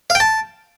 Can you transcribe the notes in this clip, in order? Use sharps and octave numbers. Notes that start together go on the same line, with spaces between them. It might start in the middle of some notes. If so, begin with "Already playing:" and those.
F5
G5
A5